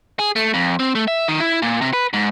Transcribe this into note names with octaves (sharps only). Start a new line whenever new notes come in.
G#4
A3
F2
C4
A3
E5
D#3
E4
A#2
C3
B4
G#2